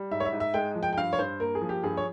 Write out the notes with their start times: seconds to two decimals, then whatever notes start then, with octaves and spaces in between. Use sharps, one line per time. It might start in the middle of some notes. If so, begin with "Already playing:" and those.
Already playing: G3
0.11 G#2 E5
0.20 C#5
0.25 E5
0.33 G#2
0.40 E5
0.54 G#3 G5
0.75 F3
0.83 G5
0.93 G5
0.97 G2 F5
1.13 C#5
1.19 G2 C5
1.40 A#3 A#4
1.55 G#4
1.61 F3
1.69 G4
1.83 G2 G#4
1.97 C#5